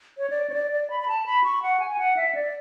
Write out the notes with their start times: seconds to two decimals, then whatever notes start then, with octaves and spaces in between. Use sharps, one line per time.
0.18 C#5
0.30 D5
0.50 C#5
0.54 D5
0.71 D5
0.90 B5
1.00 B5
1.08 A5
1.26 B5
1.44 C#6
1.62 F#5
1.80 G#5
1.98 F#5
2.17 E5
2.35 D5